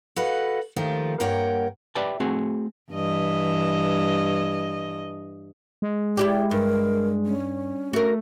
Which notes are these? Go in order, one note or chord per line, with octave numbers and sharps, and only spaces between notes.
F#4 A4 B4 D#5 F5
D#2 D#3 F3 A3 F4
G2 A#3 A#4 C#5 F#5 G5
G4 B4 D5 E5 G5 A5
A3 C4 F#4 G#4
G2 E3 D#5
G#3
E4 F#4 G4 D5
G2 A#4
C#4
A3 F#4 A#4